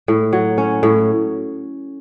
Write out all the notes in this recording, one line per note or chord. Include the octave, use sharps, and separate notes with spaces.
A2
F#3
C#4
A2